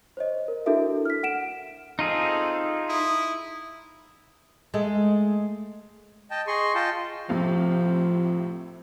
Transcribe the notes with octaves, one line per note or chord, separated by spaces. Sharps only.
C5 C#5 D#5
A#4
D4 E4 F#4 A4 A#4 E5
F6 B6
F#5 D7 E7
C4 D#4 F4 G#4 A4
E4 D#6
G#3 A3
D#5 G5 A5
G#4 D#5 C6 C#6
F4 D#5 G5 A5
A2 C3 F3 F5